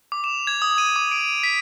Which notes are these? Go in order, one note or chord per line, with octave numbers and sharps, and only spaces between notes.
D6
E7
G#6
D#6
D#7
D6
D7
B6